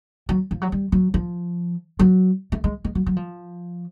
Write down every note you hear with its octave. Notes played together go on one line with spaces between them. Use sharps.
F#3
F3
F#3
G3
F#3
F3
F#3
A3
G#3
G#3
F#3
F#3
F3